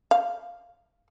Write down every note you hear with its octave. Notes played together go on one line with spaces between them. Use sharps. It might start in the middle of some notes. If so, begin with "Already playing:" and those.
F5